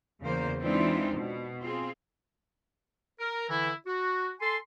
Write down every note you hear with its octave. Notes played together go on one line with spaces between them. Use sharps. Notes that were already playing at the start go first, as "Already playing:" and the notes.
E2 C#3 A#3 C5
E3 G#3 C4 D4 D#4 F4
B2
C4 F4 G#4
A#4
D3 E3 E4
F#4
A4 G#5 C6